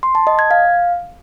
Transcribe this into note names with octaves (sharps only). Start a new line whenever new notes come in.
C6
A5
D#5
G#6
F5